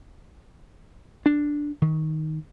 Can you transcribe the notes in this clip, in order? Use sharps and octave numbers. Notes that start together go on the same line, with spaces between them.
D4
D#3